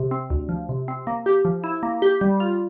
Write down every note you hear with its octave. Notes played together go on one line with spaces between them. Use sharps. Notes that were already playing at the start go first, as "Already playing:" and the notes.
Already playing: C3
C4
D2
F3
C3
C4
A#3
G4
F3
E4
A#3
G4
G3
F4